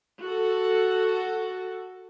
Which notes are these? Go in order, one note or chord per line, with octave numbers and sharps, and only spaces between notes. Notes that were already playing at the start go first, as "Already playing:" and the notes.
F#4 A4